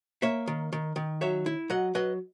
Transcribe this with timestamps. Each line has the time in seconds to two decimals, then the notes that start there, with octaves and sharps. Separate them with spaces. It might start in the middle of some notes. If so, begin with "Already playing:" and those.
0.22 A#3 C#5 E5
0.48 D#3
0.72 D#3
0.96 D#3
1.21 F#3 C#5 E5
1.46 E4
1.70 F#3 D#5 F#5
1.95 F#3 B4 D#5